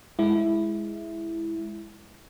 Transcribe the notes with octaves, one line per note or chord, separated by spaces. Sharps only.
G#3 E4